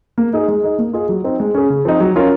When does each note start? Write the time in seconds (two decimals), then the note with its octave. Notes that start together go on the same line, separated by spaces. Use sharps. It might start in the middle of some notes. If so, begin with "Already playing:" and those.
0.18 A#3
0.33 D#4 G#4 D#5
0.48 G#3
0.63 D#4 G#4 D#5
0.78 A#3
0.93 F4 G#4 D#5
1.09 F#3
1.24 C4 D#4
1.40 G#3
1.55 C#4 G#4
1.70 C#3
1.85 F3 C4 D#4
2.00 F#3
2.16 C#4 F4 A#4 C#5